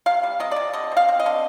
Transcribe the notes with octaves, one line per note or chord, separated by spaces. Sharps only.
C3 F5
G3
C3 D#5
C3 D5
D3 D#5
C4 F5
C4
D#5
D3